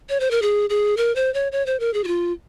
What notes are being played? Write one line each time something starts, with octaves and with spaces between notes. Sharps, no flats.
C#5
C5
A#4
G#4
G#4
A#4
C5
C#5
C#5
C5
A#4
G#4
F#4
F4